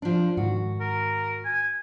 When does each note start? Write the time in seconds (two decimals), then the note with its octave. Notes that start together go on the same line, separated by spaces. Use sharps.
0.02 F3 D4
0.37 G#2 D#3 F#4
0.81 A#4
1.45 G#5